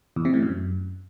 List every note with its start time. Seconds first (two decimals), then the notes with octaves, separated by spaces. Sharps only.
0.16 E2
0.25 C3
0.34 A2
0.42 F#2